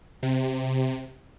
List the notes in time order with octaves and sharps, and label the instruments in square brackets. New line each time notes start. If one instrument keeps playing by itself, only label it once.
[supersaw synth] C3